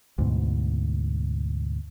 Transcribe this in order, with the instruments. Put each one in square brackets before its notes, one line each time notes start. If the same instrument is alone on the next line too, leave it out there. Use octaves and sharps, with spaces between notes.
[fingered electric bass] D2 G#2 B2